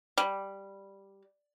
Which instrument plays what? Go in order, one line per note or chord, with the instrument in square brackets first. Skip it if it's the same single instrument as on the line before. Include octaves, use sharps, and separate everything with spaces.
[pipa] G3